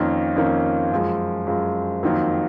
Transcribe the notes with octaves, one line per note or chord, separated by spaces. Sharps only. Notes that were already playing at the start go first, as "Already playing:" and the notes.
Already playing: F2 D#3 A#3 C#4
F2 D#3 A#3 C#4
F#2 F3 G#3
F#2 F3 G#3
F2 D#3 F#3 A#3